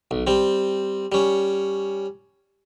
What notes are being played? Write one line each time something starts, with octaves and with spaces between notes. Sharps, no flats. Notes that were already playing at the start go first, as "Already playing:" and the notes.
B1
G3 C4
G3 C#4